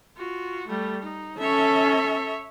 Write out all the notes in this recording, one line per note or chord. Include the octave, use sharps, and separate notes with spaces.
F4 F#4
G3 A3
D#4
C#4 A4 C#5 E5